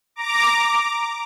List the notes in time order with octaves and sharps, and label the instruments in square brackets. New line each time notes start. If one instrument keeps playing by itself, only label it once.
[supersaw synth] A#5 D6